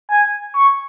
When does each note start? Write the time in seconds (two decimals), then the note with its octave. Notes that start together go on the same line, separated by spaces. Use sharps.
0.10 G#5
0.55 C#6